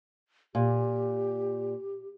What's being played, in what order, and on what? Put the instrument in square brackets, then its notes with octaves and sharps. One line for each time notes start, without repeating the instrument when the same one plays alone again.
[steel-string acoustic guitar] A#2 [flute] G4